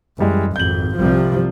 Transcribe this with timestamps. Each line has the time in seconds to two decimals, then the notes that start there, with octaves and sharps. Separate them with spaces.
0.19 F#2 E3 G3 G#3
0.56 G#1 F2 G6 F#7
0.96 C2 C3 F3 G3